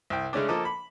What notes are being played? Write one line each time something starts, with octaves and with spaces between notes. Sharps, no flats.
C2 G5
C#3 G#3 A3 C#4 D4
F3 A#3 A4 D#5 A5 D6
B5